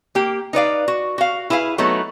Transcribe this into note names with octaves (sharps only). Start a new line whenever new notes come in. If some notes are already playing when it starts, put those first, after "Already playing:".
A#3 G4
D#4 B4 D5 F5
F#4
F#4 F5
E4 G#4 B4 F5
F#3 A3 B3 D#4